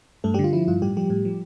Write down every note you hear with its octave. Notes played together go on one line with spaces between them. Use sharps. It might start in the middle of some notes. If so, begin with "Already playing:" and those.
G2 A3 A4
D3 G3 G4
F4
F3 E4
G2 F4
A2 G3 G4
F3 G3 G4
A2
F3